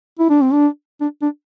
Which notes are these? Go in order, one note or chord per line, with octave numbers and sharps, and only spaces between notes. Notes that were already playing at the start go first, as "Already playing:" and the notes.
E4
D4
C4
D4
D4
D4